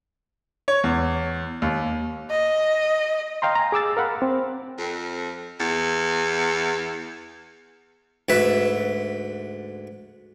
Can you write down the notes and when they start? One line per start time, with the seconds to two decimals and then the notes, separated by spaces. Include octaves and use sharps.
0.68 C#5
0.84 E2
1.62 D#2
2.30 D#5
3.42 D#5 F5 G5 A#5 C6
3.55 G#5 A#5
3.72 G#4 D6 E6 A6
3.97 A#4 F5 F#5 B5
4.22 C4
4.78 F2
5.60 E2
8.29 D2 G#2 B4 E5